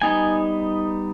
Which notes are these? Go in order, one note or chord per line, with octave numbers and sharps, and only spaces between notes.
G3 B3 D#4 G#5